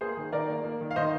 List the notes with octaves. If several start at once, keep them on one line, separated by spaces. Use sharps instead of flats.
A#3 G#4 C5
D#3
D#3 A#4 D5
A#3
A#3
D#3
F5
D#3 C5 D#5